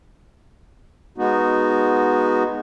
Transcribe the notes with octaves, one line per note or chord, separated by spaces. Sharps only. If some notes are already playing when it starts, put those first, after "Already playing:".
G#3 B3 D#4 F#4